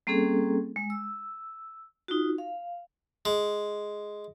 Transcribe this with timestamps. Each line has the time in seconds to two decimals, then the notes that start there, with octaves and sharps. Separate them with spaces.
0.07 G3 A#3 C4 C#4 G#4 A4
0.76 G#3
0.90 E6
2.08 D#4 F4 F#4
2.38 F5
3.25 G#3